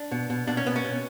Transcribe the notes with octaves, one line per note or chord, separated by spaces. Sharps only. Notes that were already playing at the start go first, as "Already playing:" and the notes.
Already playing: D4
B2
B2
B2 D4
C#4
B2 B3
C#4
B2